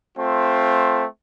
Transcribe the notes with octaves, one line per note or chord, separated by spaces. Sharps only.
A3 C4 F4